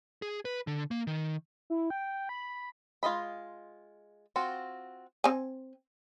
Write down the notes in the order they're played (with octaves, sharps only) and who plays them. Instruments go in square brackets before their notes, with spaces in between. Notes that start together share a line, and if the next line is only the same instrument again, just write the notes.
[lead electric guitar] G#4
B4
D3
A#3
D#3
[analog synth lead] E4
G5
B5
[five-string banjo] G#3 F4 G#4 D#5 B5
C4 F4 F#4
[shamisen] C4 G#5